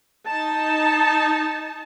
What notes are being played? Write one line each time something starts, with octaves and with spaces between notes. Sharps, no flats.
D#4 A5